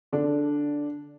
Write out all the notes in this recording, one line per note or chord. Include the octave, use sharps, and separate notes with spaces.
D3 D4